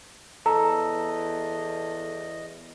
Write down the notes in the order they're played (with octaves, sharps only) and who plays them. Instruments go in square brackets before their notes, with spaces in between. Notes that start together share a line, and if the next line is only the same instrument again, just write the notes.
[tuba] E2 [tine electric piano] A4 [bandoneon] D#5 [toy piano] A#5